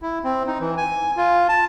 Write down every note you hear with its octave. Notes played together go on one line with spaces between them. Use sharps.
E4
C4
D#4
E3
G#5
F4
A5